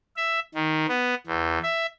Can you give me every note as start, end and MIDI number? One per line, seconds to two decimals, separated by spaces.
0.17 0.40 76
0.55 0.86 51
0.88 1.14 59
1.27 1.58 40
1.63 1.86 76